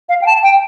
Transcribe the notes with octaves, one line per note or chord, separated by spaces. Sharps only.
F5
G5
A5
G5